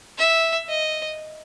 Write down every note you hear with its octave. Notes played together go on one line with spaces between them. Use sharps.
E5
D#5